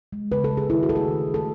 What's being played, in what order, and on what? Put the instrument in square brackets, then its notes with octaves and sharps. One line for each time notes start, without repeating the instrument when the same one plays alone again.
[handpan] G#3
C#3 B4
A4
G#3
G#4
D#3 E4
F#4
A3 A4
G#4
D#3
A3
A4